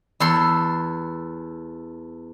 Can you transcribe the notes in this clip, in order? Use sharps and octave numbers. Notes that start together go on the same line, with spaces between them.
E2 A4 C6